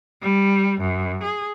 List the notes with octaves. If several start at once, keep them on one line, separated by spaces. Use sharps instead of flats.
G3
F#2
G#4